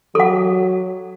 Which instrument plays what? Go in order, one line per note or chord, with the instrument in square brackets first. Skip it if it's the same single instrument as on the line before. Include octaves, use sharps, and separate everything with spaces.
[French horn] F#3 [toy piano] A4 F#5